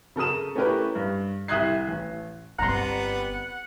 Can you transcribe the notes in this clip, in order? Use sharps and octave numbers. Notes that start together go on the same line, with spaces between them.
C#3 A4 A#4 D#6 E7
A3 C#4 E4 G4 A#4 B4
G2
C2 E5 D#6 F#6 G#6 C7
A1
G1 G3 B3 C4 F#5 A#5 C6